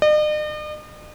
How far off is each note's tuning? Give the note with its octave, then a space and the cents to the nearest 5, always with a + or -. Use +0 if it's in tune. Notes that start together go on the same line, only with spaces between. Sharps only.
D#5 -45